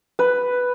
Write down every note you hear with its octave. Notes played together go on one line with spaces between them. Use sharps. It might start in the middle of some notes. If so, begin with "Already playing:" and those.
B4